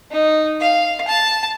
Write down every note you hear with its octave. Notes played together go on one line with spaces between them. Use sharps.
D#4
F5
A5